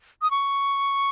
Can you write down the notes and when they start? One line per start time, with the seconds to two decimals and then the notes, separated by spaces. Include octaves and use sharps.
0.22 D#6
0.31 C#6